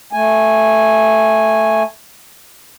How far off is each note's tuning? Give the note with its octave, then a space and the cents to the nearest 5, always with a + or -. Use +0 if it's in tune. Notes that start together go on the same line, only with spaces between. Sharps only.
A3 +0 G#5 +0